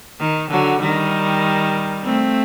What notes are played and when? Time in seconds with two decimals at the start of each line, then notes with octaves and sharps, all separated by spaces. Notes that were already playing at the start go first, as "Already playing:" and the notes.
0.19 D#3
0.50 D3 F#3
0.81 D#3 G3
2.04 A3 C4